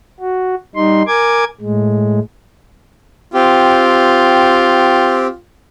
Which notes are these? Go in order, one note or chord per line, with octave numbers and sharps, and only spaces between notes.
F#4
G3 D#4 C6
A#4 G#5 D6 G#6
A2 G#3
C4 F4 G4